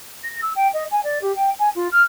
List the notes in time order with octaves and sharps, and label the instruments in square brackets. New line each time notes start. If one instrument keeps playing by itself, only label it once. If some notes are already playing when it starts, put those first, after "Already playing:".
[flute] A#6
E6
G5
D#5
G#5
D5
G4
G5
G#5
F4
F6